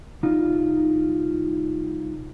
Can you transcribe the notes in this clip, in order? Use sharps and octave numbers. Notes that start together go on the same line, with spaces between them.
C2 D#4 F4